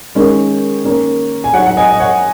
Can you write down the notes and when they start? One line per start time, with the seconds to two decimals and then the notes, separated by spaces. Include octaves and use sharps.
0.15 D#3 G#3 C#4
0.84 D#3 A#3 C#4
1.44 G#5
1.54 F#3 D#4 C#5 F#5
1.66 F#5
1.77 D#5 G#5
1.91 D#5
2.00 C#5 F#5